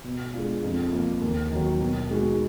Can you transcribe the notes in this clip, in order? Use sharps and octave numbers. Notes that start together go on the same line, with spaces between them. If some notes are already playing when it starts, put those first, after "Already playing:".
B2
G#3 D4 F4
F2
F3 A#3
D#2
D#3 F#3
B2
G#3 D#4 F#4